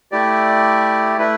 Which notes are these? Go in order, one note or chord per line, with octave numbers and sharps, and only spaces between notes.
A3 E4 G4 D5
A3 E4 B4